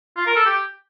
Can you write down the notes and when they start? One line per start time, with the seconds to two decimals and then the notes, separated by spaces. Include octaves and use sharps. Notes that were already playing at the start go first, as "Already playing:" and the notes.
0.17 F4
0.26 A#4
0.36 A4
0.46 G4